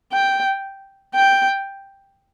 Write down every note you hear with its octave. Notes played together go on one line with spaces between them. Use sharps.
G5
G5